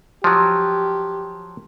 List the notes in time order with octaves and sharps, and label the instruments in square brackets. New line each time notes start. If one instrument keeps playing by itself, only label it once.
[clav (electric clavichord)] F3 F#3 [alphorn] G4